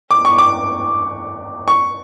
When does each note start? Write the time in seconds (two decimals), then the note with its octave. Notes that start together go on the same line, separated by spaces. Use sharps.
0.11 D6
0.25 C#6
0.38 D6
1.68 C#6